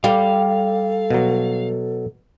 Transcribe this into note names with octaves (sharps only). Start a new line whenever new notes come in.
G3 G4 A4 F5
B2 F#3